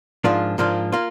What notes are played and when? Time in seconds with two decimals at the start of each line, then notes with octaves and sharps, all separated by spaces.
0.24 G#2 F3 A#3 D4 F4
0.58 G#2 F3 A#3 D4 F4
0.92 A#3 F4